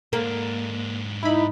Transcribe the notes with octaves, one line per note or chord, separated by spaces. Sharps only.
G#2 A#3 D4
D#4 E4 B5